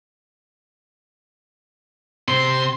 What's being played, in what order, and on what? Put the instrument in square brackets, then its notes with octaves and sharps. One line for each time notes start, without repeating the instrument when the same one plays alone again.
[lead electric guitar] C3 C4 [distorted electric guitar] C6